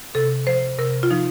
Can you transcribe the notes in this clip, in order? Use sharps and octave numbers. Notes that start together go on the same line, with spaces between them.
C3 A4
F3 C5
C3 A#4
F4
F3 D#4